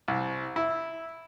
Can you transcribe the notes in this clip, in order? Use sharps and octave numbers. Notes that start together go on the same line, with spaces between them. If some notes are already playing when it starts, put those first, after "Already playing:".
C2
E4